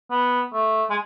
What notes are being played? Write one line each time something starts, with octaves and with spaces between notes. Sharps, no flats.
B3
A3
G#3